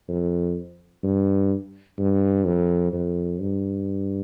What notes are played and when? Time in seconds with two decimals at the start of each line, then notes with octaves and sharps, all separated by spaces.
0.08 F2
1.03 G2
1.98 G2
2.46 F2
2.93 F2
3.41 G2